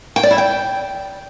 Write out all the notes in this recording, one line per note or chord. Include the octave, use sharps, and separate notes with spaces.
G5
D5
E4
G5